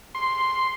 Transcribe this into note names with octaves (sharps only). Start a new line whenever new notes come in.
C6